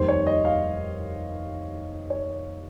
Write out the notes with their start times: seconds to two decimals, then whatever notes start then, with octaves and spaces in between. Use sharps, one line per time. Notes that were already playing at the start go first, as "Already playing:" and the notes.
Already playing: F1 D#2 D#3 G3 C5
0.08 C#5
0.27 D#5
0.45 F5
2.10 C#5